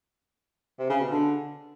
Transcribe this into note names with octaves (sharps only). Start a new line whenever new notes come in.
C3
C#3
B2
D3